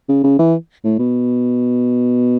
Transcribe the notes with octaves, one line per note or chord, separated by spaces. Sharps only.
C#3
C#3
E3
A2
B2